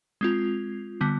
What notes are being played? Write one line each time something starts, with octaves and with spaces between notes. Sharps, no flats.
G#3 C4 F4
D3 G3 B3